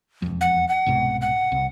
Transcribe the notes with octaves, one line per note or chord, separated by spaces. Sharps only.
E1 F2
F#5
F#5
C2 G#2 B2
F#5
C2